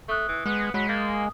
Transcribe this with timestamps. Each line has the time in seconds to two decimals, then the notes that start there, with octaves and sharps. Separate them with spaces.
0.08 A3 C#6 D#6 F#6
0.28 E3
0.46 G#3 B3
0.74 F#3 G#3 B5 B6 C#7
0.89 A#3 G6 A6
1.13 D#6